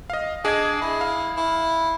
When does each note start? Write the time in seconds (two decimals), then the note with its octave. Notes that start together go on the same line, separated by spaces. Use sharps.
0.10 D#5 F5
0.45 D4 G#4 D#5 G#6
0.81 E4
1.01 F5
1.37 E4